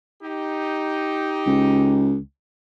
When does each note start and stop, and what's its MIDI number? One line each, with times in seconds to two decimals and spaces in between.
0.22 2.10 63
0.22 2.10 67
1.47 2.18 37